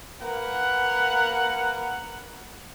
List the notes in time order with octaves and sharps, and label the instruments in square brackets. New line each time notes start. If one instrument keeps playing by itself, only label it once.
[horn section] A#3 A#4 B4 F#5